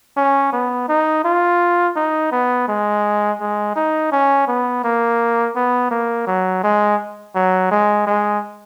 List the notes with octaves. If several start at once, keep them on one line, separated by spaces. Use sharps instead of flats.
C#4
B3
D#4
F4
D#4
B3
G#3
G#3
D#4
C#4
B3
A#3
B3
A#3
F#3
G#3
F#3
G#3
G#3